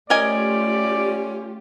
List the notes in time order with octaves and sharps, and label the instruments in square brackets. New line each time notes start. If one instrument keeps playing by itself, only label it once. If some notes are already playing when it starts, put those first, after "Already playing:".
[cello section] A3 F4 G4 [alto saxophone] C#4 [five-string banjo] A#4 D#5 G#5 [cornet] D5